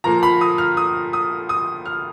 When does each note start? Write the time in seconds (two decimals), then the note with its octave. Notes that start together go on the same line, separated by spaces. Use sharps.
0.04 A#2 F3 A#3 A#5
0.23 B5
0.41 D#6
0.58 F6
0.77 D#6
1.13 D#6
1.49 D#6
1.86 F6